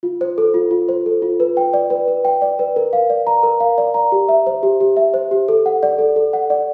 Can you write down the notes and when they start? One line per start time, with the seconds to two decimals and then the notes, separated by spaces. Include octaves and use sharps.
0.03 F4
0.21 C5
0.38 A4
0.54 F4
0.71 F4
0.89 C5
1.06 A4
1.22 F4
1.40 B4
1.57 G5
1.73 D5
1.90 B4
2.08 B4
2.25 G5
2.42 D5
2.59 B4
2.76 A#4
2.93 F5
3.10 D5
3.27 A#5
3.43 A#4
3.60 F5
3.78 D5
3.94 A#5
4.12 G4
4.29 E5
4.47 C5
4.63 G4
4.81 G4
4.97 E5
5.14 C5
5.31 G4
5.48 A4
5.66 F#5
5.83 D5
5.99 A4
6.16 A4
6.33 F#5
6.50 D5